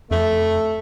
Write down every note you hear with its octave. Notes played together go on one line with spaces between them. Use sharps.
F2 A3